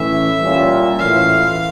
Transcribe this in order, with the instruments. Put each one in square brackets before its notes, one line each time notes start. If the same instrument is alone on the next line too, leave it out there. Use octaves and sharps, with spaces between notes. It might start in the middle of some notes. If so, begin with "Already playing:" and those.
Already playing: [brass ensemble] A2 E3 A3 C#4 [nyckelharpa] E5
[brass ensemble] A#2 G3 C#4 F4
[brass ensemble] A2 E3 A3 C#4 F4 [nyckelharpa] F5